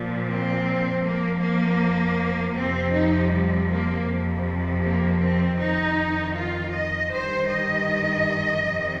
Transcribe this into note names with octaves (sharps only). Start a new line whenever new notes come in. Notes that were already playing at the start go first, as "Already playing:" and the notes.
Already playing: A#2 F3
C4
F2 F3 A#3
A#3
F2 C3 F3 C4
D#4
G3
A#3
F2 C3 F3
A#3
C4
F2 D#3 D#4
F4
D#5
G2 D#3 C5
D#5
F2 C3 D#3